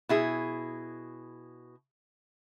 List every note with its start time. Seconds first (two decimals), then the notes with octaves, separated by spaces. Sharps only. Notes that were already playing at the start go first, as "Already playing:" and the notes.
0.09 B2 E4 G#4